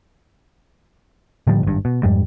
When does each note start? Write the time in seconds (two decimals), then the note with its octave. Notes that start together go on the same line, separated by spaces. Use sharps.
1.47 A2 D3 F3 G3
1.63 G#1 G2
1.85 B2
2.03 F2 G#2 G3